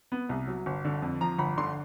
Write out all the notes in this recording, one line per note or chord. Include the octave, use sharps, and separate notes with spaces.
B3
C2
F#3
G1
D3
F2
F3 A#5
G1 B5
D3 C6